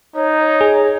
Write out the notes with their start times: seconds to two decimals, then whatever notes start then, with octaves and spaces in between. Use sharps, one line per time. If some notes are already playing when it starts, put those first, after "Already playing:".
0.16 D#4 C#5
0.61 G#4